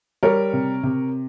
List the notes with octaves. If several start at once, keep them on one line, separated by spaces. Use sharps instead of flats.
G3 A#4 C#5
C3
C3